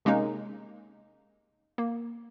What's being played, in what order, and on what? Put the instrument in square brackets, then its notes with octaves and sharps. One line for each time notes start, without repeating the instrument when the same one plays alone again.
[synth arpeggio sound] C3 G#3 A#3 C#4 D#4
A#3